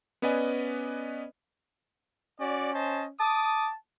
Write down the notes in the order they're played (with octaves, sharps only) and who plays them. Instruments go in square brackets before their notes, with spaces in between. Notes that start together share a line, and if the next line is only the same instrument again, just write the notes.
[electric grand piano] B3 C#4 B4 D5 D#5 G#5
[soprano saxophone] C#4 [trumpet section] F#4 D5
[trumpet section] C5 D#5 A5
[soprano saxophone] A5 [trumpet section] D6 D#6